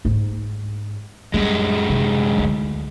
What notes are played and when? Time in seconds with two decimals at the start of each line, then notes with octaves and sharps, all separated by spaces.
0.05 G#2 D#4
1.34 F#2 G3 G#3
1.89 C3
2.38 D2